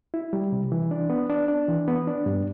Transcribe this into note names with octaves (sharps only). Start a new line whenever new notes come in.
E4
G3
C3
E3
D4
B3
D4
D4
E3
B3
D4
G2